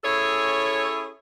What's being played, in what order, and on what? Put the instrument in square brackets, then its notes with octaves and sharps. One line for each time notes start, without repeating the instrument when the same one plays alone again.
[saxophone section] C#4 E4 G#4 A4 C#5